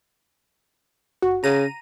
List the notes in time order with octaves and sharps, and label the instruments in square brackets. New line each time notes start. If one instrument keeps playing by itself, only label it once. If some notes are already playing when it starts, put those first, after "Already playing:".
[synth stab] G1 F#4
[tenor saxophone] C#3 [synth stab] A#5 D#7